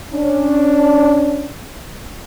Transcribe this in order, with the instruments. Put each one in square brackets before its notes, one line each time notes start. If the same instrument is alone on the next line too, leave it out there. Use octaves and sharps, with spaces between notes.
[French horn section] C#4 D4